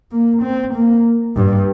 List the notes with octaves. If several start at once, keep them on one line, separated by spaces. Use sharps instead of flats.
A#3
C4
A#3
G2